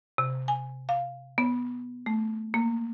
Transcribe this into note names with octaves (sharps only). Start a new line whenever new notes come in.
C3
G#5
F5
B3
A3
A#3